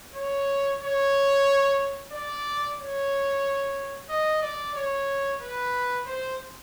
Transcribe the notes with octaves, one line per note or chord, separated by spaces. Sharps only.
C#5
C#5
D5
C#5
D#5
D5
C#5
B4
C5